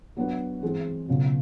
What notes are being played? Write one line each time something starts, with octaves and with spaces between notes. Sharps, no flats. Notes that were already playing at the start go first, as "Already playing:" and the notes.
F#3 B3 D4 F#4 B4
E3 G#3 C4
C#2 B2 F#3